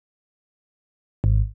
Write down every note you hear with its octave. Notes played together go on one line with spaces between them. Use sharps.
G#1